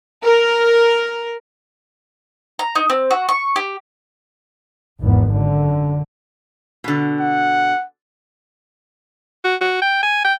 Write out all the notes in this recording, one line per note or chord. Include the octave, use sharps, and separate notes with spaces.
A#4
A#5
D#4
C4
F#4
C#6
G4
G#1 E2 B3
F#2 D3
B2 D3
F#5
F#4
F#4
G5
G#5
G5